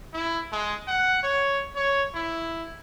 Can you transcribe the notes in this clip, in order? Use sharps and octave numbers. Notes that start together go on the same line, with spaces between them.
E4
G#3
F#5
C#5
C#5
E4